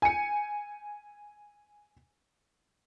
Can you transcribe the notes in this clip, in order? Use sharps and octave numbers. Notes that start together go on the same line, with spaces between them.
G#5 C#7